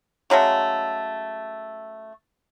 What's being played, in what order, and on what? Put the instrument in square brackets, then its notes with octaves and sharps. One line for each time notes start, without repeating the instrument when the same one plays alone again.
[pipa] C#3 F#3 G#3 A3